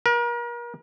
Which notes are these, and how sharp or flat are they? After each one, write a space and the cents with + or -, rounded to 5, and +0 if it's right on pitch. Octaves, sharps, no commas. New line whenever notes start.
A#4 +40